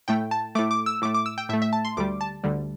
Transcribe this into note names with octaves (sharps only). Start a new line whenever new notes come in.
A2 A3 G5
A5
A2 A3 D6
D6
E6
A2 A3 D6
D6
E6
G5
A2 A3 E5
E5
A5
C6
D2 D3 G3 D6
A5
D2 D3 G3